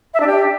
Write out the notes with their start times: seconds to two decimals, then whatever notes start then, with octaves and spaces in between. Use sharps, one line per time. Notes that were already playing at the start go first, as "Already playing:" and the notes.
0.14 E5
0.20 D4
0.27 G4